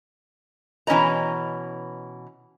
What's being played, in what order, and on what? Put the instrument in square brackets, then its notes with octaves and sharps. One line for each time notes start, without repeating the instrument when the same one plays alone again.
[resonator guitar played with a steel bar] B2 E3 C#4 C#5 D#5 A#5